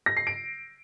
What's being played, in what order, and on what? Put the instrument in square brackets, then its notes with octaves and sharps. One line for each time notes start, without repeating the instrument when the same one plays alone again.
[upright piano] A#6
C7
D7